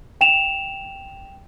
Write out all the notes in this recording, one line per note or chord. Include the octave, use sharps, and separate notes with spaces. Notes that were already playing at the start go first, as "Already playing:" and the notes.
G5 E7 F7